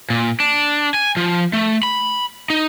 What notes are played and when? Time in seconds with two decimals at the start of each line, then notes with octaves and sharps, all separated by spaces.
0.10 A#2
0.40 D4
0.94 G#5
1.17 F3
1.53 A3
1.83 B5
2.50 D#4